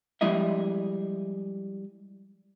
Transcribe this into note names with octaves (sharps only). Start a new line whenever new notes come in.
F3 G3 G#3 E4 D#5 E5